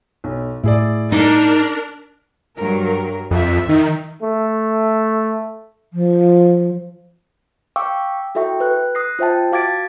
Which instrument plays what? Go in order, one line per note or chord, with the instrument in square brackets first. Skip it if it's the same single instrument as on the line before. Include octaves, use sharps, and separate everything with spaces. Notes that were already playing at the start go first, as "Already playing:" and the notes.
[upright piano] B1
[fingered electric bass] A2 [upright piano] E4 G#4 D5
[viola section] D4 A#4 [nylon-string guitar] D#4
[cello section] G2 F#3 A#4
[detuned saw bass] F2 [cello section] E5
[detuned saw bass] D#3
[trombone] A3
[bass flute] F3
[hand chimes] F5 G5 C#6 D6 E6
E4 F#4 A4 E5 G5 C#6
B4 F#6
D#6 F#6 A#6 C7
F4 C5 E5 G5 A5
F#4 F5 D6 G#6 A6 D7